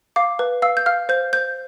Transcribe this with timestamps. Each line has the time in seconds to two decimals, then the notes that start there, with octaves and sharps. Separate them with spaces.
0.16 F5 D6
0.39 B4
0.62 F5 E6
0.77 G6
0.86 F5 F6
1.09 C5 G6
1.33 C5 G6